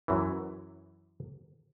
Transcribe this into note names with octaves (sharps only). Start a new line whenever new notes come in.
F#2 E3